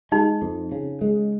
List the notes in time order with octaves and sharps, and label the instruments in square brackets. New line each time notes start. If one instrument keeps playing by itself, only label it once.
[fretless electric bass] G#3 [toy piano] D#4
[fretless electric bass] F2
C#3
G#3